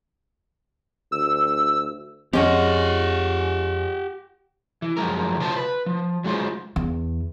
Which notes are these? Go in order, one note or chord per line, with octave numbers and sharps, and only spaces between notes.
D2 E6
F2 F3 G#3 C4 C#4 G4 F#5
E3
F#2 F3 G#3 A#4
C#3 F4 C5 A5
B4
F3
F#3 G#3 F4 C5
E2